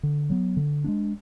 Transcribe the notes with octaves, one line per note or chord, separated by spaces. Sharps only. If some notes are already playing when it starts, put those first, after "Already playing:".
D3
F#3 B3
D3
G#3 B3 D4